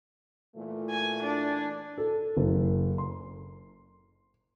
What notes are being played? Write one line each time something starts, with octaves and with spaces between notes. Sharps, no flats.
A#2 E3 A3
G#5
D4
A4
F#1
C6